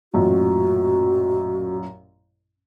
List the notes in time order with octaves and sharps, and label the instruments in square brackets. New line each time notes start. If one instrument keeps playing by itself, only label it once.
[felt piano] A1 F#2 A#2 [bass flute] F#4